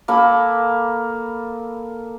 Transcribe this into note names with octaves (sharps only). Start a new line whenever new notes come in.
A#3 A4 B5